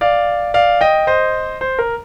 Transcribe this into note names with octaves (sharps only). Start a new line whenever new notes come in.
D5 F5
D5 F5
D#5 G5
C5 D#5
C5
A#4